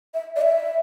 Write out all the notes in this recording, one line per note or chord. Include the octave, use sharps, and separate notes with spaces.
E5
D5
E5